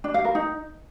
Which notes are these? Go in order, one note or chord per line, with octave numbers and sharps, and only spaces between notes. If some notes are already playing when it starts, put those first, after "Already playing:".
D4
F5
A#4
D#4